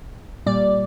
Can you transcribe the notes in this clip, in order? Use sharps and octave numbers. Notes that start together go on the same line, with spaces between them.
A#2 G3 D5